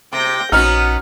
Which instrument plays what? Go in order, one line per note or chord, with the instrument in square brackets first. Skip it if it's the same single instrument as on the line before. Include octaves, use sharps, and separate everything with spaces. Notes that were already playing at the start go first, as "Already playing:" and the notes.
[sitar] C3 [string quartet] G5 G6 A#6
[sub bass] A#1 [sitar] B3 C#4 D#4 [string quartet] F#4 [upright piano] F6